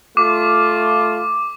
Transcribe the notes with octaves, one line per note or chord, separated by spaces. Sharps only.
A3 F4 D6